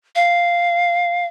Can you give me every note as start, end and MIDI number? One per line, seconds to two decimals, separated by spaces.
0.16 1.26 77